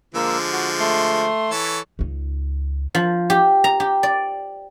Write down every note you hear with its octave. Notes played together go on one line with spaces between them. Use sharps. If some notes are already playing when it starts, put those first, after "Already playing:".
D3 F3 G#3 A#3 E6
F#4
A3 C6
E3 A4 C#5
C#2 D#4
F3
G4
A#5
G4
D5